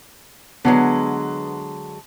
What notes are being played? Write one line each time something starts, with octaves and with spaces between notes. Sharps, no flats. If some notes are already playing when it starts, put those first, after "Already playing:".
D3 F#3 G#3 B3